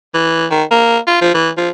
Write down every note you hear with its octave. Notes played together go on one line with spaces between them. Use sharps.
E3
D#3
A#3
F4
F3
E3
F3